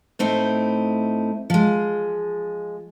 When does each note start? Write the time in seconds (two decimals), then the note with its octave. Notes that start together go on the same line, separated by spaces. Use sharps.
0.19 A2 A3 C4 D#4 E4
1.50 F3 G#3